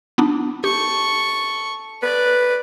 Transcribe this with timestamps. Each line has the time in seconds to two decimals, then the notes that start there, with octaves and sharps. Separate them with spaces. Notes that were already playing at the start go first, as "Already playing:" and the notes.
0.18 B3 D4 D#4
0.64 G4 A4 C#6
2.03 B4 D5